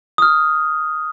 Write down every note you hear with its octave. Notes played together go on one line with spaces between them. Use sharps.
D#6 F6